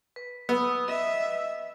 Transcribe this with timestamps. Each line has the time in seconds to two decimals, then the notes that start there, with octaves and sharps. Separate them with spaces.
0.16 B4
0.49 B3 D#6 E6
0.88 D#5 E5